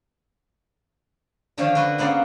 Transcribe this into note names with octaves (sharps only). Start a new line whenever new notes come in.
D3 D#3 F3 D4 C#5 F5
D3 F#4 B4
C#3 A#3 B3 D4